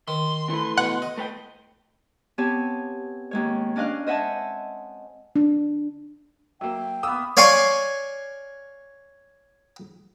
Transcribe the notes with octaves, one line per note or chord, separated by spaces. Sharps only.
D#3 C6
E3 A3 B4
B2 F#5
D#5
A3 B4 G5
B3 C4 G4 C#5 G#5 A5
D#2 G#3 C#5
C#4 D4 D#5 F5 F#6
C5 D#5 E5 F#5 G#5 A5
D4
F#3 A#3 E5 G5
A#3 B3 D#6 E6
C#5 D5 F5 G#5 C6 C#6